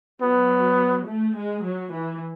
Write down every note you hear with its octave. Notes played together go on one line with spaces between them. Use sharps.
F#3 B3
A3
G#3
F#3
E3